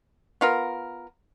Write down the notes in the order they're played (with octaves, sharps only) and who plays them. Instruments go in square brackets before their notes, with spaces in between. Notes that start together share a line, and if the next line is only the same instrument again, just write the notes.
[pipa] B3 F4 A#4